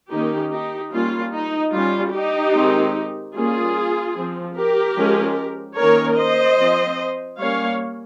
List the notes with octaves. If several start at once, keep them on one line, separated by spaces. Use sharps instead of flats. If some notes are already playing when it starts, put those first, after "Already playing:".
D#3 A#3 C#4 D#4 G4
D#4 G4
G3 A#3 C#4 F4
D#4
G3 C#4 F4
D#4 G4
D#3 G#3 C4
G3 A#3 C#4 F4 G#4
F3 C4
G4 A#4
F3 G#3 C#4
D#3 A#3 C#4 A#4 C#5
C5 D#5
F3 C4
G3 A#3 C#4 C#5 F5